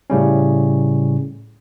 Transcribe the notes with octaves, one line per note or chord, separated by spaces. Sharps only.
A2 C#3 G3 C#4